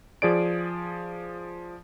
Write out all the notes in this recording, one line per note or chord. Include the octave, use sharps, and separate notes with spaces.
F3 G#4 D5 D7